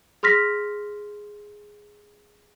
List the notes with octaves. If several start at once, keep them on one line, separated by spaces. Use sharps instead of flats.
G#4 C6 F6 A#6 B6